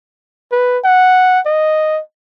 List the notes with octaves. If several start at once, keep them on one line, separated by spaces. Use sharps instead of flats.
B4
F#5
D#5